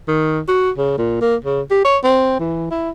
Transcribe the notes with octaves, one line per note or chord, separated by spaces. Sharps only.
D#3
F#4
C#3
A#2
A#3
C#3
G4
C#5
C4
E3
E4